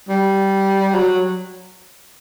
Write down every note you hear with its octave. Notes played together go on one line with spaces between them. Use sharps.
G3
F#3